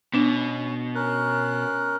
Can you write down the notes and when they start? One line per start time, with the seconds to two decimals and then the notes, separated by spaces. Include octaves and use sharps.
0.14 B2 B3 C#4 D4
0.95 C#4 A#4 F#6